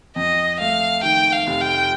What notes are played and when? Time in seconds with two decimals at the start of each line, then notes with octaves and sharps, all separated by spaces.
0.16 F2 D#5
0.60 A3 F5
1.03 D#3 G5
1.32 F5
1.47 F1
1.61 G5